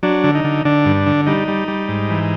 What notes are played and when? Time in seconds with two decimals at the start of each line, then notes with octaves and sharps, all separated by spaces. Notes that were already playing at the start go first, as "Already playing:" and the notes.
0.03 F#3 D4
0.24 D3
0.35 D#4
0.44 D3
0.65 D3 D4
0.85 G2
1.06 D3
1.26 G3 D#4
1.48 G3
1.68 G3
1.89 G#2
2.10 E3